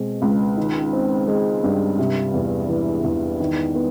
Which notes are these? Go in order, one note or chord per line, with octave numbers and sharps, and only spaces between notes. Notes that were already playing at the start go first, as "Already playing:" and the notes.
Already playing: B2 G#3 C4
C#2
D#3
C4
G#3
G2
C3
E2
E3
E2
D#3
B3